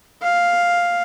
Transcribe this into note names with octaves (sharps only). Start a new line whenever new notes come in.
F5